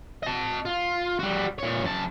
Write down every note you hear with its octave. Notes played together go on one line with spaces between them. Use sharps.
D#5 A5
F4
G3 F#4
A#2 C#5
F#2 A5